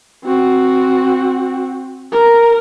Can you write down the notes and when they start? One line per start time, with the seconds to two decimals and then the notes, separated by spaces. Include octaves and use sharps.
0.24 C4 F#4
2.12 A#4